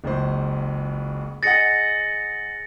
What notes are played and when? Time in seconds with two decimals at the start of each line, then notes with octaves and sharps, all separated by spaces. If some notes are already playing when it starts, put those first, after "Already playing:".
0.04 F#1 C#2 C5
1.43 G#4 D#5 F#5 A6 A#6 C#7